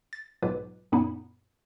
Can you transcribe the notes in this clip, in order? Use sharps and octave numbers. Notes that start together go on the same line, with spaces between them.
A6
B1 G#2 F4 B4 D6
F#2 A#2 B3 D#4 E4